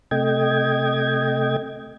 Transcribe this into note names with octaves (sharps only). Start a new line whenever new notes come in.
C3 A3 D#5 G5 G#6